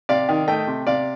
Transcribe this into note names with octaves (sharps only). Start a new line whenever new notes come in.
C3 D5 F5
D#3
A3 D#5 G5
C3
C3 D5 F5